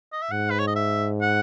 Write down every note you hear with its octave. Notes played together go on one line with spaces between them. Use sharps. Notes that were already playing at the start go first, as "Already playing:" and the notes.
D#5
E5
G#2 F#5
B4
C#5
D#5
E5
F#5